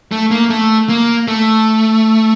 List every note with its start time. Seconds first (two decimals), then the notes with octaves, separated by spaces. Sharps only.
0.12 A3
0.31 A#3
0.50 A3
0.89 A#3
1.28 A3